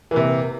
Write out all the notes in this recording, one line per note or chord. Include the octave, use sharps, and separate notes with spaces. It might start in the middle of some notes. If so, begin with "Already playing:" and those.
C3 E3 A#3